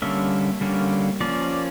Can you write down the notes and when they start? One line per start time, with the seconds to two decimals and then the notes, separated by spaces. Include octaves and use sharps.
0.02 D3 G3 A#3 C#4 E5
0.61 D3 G3 A#3 C#4
1.21 F3 A#3 C#4 D5